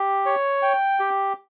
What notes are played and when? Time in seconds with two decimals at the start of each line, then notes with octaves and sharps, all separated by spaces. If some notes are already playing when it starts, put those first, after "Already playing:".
Already playing: G4
0.26 C#5
0.63 G5
1.00 G4